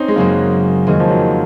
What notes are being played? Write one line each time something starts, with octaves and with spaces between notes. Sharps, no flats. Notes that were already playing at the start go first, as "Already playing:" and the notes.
Already playing: C4 C#4 D#4
G#3
F#2 C#3 F#3 A#3
F2 D#3 G#3 A#3 C#4
F3
F#3